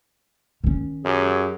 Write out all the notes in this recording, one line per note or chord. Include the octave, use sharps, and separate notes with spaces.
D#3 C#4
F#2 F#3 G4 G#4